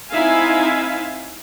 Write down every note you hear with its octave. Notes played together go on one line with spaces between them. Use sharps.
C4 D#4 E4 E5 F5 G#5